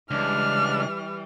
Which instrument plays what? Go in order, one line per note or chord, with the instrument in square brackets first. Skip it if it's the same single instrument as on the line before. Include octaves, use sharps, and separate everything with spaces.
[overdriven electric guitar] C#2 [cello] E3 G3 [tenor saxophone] D4 [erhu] F6